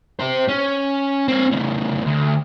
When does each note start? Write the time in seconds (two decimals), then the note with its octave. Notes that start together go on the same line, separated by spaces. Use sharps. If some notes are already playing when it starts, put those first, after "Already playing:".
0.19 G4 C5
0.48 C#4
1.28 C4 C#5
1.51 A2 C#3
2.06 D2